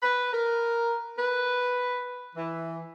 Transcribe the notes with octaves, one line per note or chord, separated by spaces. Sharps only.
B4
A#4
B4
E3